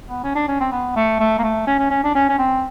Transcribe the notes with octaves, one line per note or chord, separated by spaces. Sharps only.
B3
C#4
D4
C#4
C4
B3
A3
A3
A#3
A3
C#4
C#4
C#4
D4
C#4
C#4
C4